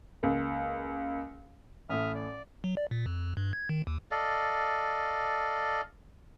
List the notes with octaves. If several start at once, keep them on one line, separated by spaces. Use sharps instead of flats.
C#2 A#3
A1 A2 E5 D#6 F6
D5
F#3
D5
A#2
F2
G2
G#6
D#3
D#2
A4 D5 D#5 F5